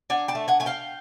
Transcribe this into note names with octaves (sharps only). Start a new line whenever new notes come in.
D4 F#5 G#5
G5 A5
A3
F#5 G#5
A3 G#5
F5 G5